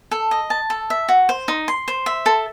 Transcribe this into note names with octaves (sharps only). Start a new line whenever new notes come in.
A4
D#5
A5
A4
E5
F#4
C5
D#4
C6
C5
E5
A4